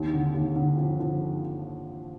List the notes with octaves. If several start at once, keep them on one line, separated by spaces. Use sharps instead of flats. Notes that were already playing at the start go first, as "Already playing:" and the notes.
Already playing: D#2
D3
D#2
D3
F3
F3